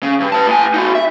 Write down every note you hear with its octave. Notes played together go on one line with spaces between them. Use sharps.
C#3
G2
B4 A5
A2 G#5
D#4 F#4
E5